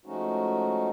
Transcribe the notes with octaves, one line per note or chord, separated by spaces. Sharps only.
F3 G#3 A3 C#4 D#4 F#4